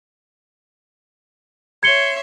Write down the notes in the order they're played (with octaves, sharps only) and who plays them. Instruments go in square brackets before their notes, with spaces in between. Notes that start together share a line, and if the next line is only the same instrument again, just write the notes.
[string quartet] C#5 E5 C6 [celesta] G#6 C#7 G7